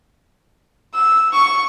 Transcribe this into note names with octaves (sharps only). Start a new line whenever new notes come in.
E6
C#6